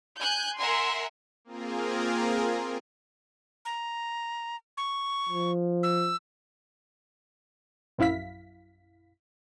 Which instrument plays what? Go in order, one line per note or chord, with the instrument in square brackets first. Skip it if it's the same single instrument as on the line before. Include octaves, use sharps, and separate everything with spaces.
[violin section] G#5 F#6 G6
A#4 E5 F#5 G#5 C6
[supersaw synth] A#3 C4 F4 G#4 A#4
[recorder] A#5
C#6
[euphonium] F3
[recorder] E6
[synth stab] A#1 F#2 E4 F5 B6